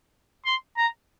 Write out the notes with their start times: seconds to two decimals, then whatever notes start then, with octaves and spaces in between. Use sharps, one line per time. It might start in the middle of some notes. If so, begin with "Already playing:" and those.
0.46 C6
0.77 A#5